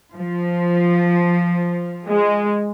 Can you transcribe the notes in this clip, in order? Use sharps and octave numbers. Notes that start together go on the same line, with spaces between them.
F3
G#3